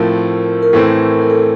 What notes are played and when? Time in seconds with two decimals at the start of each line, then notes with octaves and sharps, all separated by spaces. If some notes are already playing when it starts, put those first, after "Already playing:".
Already playing: A2 F3 A3 C4 A#4
0.62 A#4
0.73 A2 E3 A3 C4 A4
1.22 A#4
1.30 A4